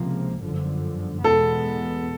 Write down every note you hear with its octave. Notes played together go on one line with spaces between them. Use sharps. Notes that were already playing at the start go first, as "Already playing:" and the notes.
Already playing: C#2 C3 F3 A#3
G1 F#2 D3 F3
E2 B2 G#3 B3 A4